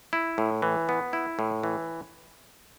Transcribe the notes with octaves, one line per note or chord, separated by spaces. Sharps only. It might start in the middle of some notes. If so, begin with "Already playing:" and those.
E4
A2
E3
B3
E4
A2
E3